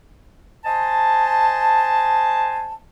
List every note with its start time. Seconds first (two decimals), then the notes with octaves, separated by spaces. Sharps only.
0.65 C5 D#5 G#5 A5